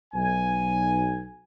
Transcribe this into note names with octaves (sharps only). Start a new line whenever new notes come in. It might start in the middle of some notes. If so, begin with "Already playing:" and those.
B1 G#5